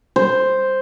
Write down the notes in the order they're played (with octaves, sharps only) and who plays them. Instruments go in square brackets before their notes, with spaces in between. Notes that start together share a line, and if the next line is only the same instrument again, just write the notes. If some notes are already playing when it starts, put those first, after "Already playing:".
[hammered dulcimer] C5